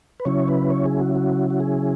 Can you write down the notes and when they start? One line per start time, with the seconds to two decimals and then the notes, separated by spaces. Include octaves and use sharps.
0.20 B4
0.25 C#3 F#3 C#4 E4 C#5
0.48 B4
0.70 C#5
0.86 G#4
1.00 F#4
1.15 F#4
1.50 F#4
1.60 G#4